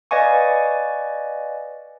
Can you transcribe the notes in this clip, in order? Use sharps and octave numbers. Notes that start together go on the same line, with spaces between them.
B4 D5 D#5 F5 G#5 C#6